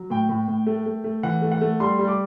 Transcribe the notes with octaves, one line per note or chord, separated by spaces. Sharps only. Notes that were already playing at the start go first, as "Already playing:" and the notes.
Already playing: F#3
A2 G5
A2
A2
A3
A3
A3
E3 F#5
A3
F#5
A3
G3 C6
G3
D6